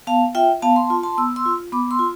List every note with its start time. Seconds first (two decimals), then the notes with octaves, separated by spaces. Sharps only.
0.07 B3 F5 A5
0.35 F4 E5 G5
0.62 B3 F5 A5
0.76 A5 C6
0.90 F4
1.03 A5 C6
1.18 B3 E6
1.36 C6 E6
1.45 F4
1.72 B3 B5 D6
1.91 C6 E6
1.99 F4